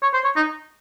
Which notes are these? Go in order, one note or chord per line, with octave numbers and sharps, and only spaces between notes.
C#5
C5
C#5
D#4